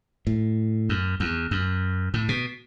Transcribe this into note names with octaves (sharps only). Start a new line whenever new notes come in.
A2
F#2
E2
F#2
A2
B2